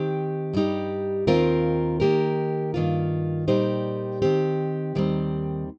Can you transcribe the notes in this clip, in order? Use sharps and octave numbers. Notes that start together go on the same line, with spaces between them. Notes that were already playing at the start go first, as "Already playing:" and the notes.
Already playing: D#3 C4 G4
G2 G3 D#4 G4
D#2 D#3 C4 F4 A#4
D#3 A#3 G4 A#4
G2 D#3 A#3 F4
A#2 G3 D#4 G4 C5
D#3 C4 G4
D#2 D#3 G3 C4